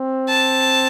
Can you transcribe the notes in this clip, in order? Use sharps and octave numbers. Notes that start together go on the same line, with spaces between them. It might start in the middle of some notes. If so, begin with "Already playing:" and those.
Already playing: C4
A5